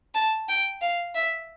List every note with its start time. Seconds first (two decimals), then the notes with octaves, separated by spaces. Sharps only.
0.15 A5
0.48 G5
0.81 F5
1.15 E5